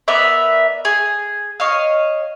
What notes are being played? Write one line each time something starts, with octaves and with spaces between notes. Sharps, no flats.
B3 A#4 D5 E5
G#4
C#5 D#5 F5